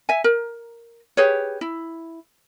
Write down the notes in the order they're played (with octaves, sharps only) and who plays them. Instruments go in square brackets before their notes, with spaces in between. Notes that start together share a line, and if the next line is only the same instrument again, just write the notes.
[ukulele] E5 G#5
A#4
G4 G#4 B4 C#5
E4